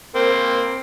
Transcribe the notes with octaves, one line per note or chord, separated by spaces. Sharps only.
A#3 C4